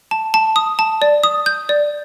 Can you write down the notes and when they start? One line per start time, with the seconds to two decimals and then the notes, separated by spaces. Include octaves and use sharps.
0.11 A5
0.34 A5
0.56 D#6
0.79 A5
1.02 D5
1.24 D#6
1.46 G6
1.69 D5